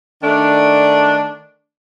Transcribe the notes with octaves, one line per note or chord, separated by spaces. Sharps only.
D#3 A3 D4